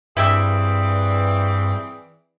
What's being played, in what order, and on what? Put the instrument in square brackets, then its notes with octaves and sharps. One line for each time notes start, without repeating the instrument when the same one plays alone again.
[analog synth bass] G2 [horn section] E3 [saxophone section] C4 G#4 D5 [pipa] E4 G4 E5